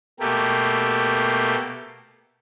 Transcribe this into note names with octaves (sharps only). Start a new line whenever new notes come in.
B2 A3 A#3 G4